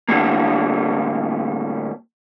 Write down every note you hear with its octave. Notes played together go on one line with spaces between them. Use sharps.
A2 D3 F#3 G3 A#3